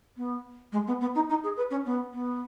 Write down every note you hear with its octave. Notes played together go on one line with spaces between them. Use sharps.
B3
G#3
B3
B3
D#4
D#4
G#4
B4
C#4
B3
B3